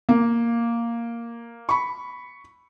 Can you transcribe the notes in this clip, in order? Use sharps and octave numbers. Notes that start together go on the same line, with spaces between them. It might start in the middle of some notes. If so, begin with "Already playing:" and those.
A#3
B5 C#6